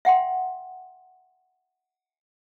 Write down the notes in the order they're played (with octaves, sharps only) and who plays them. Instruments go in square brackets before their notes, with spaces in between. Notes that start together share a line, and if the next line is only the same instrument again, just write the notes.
[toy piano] E5 F#5 G5 C6